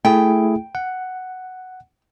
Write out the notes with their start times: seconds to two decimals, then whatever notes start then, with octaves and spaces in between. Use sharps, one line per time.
0.05 A3 E4 G#4 G5
0.75 F#5